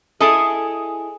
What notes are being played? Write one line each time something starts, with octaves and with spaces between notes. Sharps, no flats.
E4 G#4 A4 D#5